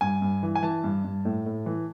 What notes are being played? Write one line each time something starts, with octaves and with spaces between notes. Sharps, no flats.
G2 G#5
G2
E3
G#5
E3 A5
G2
G2
A2
A2
E3